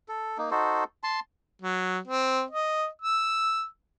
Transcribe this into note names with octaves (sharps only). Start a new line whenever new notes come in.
A4
A#3 D#4
D#4 F#4 A4 C5
A5 C6
F#3
C4
D#5
E6